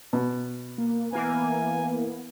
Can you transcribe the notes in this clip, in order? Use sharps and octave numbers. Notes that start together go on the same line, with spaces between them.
B2
A#3
E3 A#3 B3 G#5